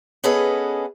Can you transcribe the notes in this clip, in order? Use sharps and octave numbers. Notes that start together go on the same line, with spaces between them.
B3 C#4 G#4 A4 B4 D#5